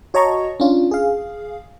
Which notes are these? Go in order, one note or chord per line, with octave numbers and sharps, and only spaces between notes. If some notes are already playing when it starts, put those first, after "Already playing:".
F#4 C#5 D#5 A5 A#5 C#6
C#4 D4 F4
G#4 F5